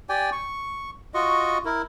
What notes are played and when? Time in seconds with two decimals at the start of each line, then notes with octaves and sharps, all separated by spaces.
0.09 G4 D5 G5 G#5
0.32 C#6
1.14 F4 F#4 D#5 C#6
1.65 E4 A#4